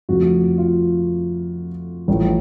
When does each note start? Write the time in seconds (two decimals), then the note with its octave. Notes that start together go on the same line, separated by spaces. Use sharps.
0.09 F2 C#3 F3 A3 F#4
0.58 F4
2.08 A1 A2 F3 A3